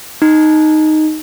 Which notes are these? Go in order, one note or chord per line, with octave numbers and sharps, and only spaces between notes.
D#4